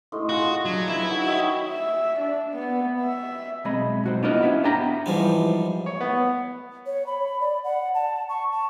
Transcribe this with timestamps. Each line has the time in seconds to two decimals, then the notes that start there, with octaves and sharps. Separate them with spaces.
0.12 A2 D#5 C6
0.29 F4 F#4 G#4
0.65 F#3 D4
0.88 E4 B4 E5
1.09 D#3 F#3
1.27 C#5 D#5 G5
1.69 E5
2.19 D4
2.54 B3
3.01 E5
3.65 B1 G#3 C4 D#5 B5
4.04 B1 F#4 C5
4.23 B3 D4 E4 F4 A#4 D#5
4.42 C#4 E4 E5 F5
4.64 B3 D4 G4 B4 G5 A#5
5.06 G#2 E3 F3 G3
5.86 C#5
6.01 B3
6.86 C#5
7.07 B5
7.40 D5
7.64 F#5
7.95 A5
8.29 C#6
8.52 A5